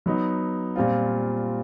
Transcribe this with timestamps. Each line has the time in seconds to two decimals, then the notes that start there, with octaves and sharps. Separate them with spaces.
0.06 F#3 B3 D#4
0.76 A#2 G3 C4 F4